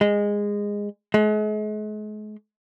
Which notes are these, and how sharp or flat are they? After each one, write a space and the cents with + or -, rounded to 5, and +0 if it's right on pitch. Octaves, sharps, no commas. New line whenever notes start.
G#3 -15
G#3 +40